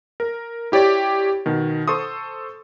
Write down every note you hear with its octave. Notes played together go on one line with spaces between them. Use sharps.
A#4
E4 G4 C#5 D5
B2 D#3
A4 C5 C6 C#6 D#6